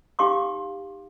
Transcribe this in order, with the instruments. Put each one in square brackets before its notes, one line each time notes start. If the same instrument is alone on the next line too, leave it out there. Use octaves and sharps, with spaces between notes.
[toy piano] D#4 G4 F5 C6 D6